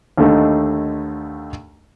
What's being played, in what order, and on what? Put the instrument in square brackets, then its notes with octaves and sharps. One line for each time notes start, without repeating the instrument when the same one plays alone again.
[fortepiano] D#2 D3 A3 D#4